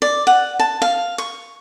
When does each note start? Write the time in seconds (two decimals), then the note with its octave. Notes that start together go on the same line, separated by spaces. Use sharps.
0.02 D5
0.27 F#5
0.59 A5
0.82 F5
1.18 C#6